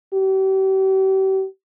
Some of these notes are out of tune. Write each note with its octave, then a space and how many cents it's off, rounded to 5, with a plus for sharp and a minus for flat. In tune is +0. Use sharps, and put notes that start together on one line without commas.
G4 -40